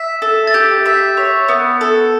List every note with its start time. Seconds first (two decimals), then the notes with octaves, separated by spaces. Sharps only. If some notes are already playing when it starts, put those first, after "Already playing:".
Already playing: E5
0.22 A4
0.47 A6
0.54 G4 G6
0.86 E5
1.17 C#5
1.48 B3
1.81 A4